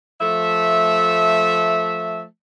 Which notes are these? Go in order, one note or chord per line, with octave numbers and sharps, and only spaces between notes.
F3 A3 E5